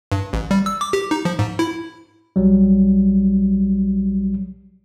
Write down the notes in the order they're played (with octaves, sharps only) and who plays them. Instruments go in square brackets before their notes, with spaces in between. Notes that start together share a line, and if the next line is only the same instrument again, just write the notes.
[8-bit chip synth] G2
A1
G3
E6
D6
G4
D#4
F3
G#2
E4
[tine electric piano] B1 F#3 G3